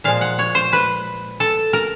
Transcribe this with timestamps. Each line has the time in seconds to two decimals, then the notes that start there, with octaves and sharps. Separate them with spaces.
0.04 A#2 F3 G#3 F5
0.21 F#5
0.39 C#5
0.55 C5
0.73 B4
1.40 A4
1.73 A#4